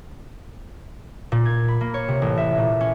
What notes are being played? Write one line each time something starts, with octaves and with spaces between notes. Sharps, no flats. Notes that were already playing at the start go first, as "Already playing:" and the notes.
A#2
G#6
B5
A#3
C#5
C3
A1
E5
A#2
C#4